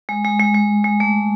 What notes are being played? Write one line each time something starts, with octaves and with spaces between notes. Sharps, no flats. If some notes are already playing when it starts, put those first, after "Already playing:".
G#3
G#3
G#3
G#3
G#3
A3